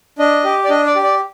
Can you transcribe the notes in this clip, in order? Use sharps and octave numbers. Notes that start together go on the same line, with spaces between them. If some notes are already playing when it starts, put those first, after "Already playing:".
D4 D#5
G4
D5
D4 D#5
D5
G4
D5